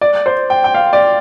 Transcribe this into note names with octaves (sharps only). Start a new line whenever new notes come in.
D5
C5
G5
G5
F5
D5